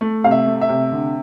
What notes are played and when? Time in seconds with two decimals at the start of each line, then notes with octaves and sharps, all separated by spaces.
0.01 A3
0.24 C3 F5
0.31 E5
0.47 A3
0.61 E5
0.69 C3
0.92 D3